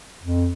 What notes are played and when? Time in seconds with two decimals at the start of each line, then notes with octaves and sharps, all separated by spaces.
0.23 F2